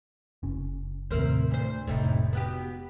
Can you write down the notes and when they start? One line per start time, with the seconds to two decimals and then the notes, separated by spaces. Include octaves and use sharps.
0.43 F#1 C#4
1.11 D#2 A2 C3 E4 A#4 C5
1.51 D2 C5
1.87 F1 A2 C3 D#4
2.33 B3 F#4 G4